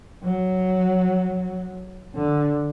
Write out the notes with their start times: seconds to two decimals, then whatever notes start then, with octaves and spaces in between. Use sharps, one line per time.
0.24 F#3
2.15 D3